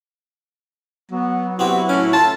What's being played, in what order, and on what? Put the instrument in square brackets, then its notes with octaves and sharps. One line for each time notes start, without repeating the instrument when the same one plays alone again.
[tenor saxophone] F#3 [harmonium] B3
[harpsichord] B3 C4 G4 [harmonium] E4 F#4
[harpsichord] A2 D6 [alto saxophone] C#4
[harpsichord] F4 A4 [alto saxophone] A5